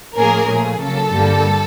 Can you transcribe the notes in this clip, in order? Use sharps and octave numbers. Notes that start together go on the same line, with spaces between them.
A2 F3 A#3 C#4 G#4 A#4
A#2 F3 A3 G#4
C#3 F#3 A#3 A4
G2 D3 G3 A#3